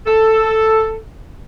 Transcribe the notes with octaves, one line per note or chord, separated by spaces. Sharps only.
A4